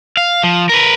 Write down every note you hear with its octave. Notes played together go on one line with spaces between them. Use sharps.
F5
F3
A#4 B4